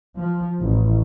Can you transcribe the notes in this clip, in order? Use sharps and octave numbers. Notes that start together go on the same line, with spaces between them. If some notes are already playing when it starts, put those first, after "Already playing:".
F3
A1